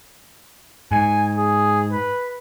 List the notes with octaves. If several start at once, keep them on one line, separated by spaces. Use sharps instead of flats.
G#2 G#5
G#4
B4